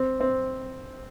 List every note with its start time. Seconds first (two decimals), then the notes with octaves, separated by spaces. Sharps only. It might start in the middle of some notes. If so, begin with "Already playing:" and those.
Already playing: C4
0.20 C4